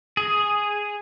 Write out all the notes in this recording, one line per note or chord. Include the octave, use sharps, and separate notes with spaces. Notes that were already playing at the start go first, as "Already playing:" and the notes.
G#4